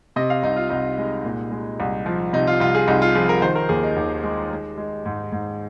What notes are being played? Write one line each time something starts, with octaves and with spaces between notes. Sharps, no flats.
C3 D#5
F5
C2 D#4
F4
C2 D#4
G#3
A#2
G#3
C2
F3
C3 D#4
F4
C2 F4
G#4
C2 D#4
F4
F3 G#4
A#4
D#3 C5
A#4
D#2 G#4
D#4
D#2
G#3
G#3
G#3
G#2
G#2